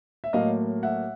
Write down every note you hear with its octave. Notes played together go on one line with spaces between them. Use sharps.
E5
A2 F#3 A#3 D#5 F5
E5 F#5